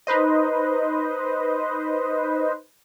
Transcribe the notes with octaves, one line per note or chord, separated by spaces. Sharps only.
D#4 B4 C5 D#5